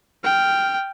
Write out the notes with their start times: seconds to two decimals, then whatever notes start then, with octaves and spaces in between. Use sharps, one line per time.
0.24 G5 F6